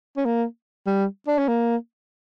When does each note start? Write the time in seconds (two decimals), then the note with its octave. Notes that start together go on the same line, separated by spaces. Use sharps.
0.17 C#4
0.25 A#3
0.86 G3
1.28 D4
1.38 C#4
1.48 A#3